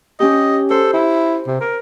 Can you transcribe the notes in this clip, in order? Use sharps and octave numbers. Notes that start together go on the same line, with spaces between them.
C#4 G4 D#5
A4 C5
E4
C3
A#4